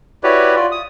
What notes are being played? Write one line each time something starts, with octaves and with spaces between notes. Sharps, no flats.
E4 F#4 G4 B4 C#5 D5
F4 D5
D#6